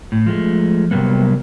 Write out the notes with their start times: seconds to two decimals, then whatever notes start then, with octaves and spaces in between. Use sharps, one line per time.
0.12 A2
0.26 F3 G#3 A3
0.91 C3 F#3 G3 A#3 B3